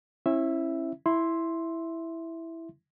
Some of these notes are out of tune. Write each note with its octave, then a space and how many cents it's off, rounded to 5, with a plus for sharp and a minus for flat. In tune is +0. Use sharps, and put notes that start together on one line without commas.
C#4 -40 E4 +0 E5 +0
E4 +0 E5 +0 C6 +0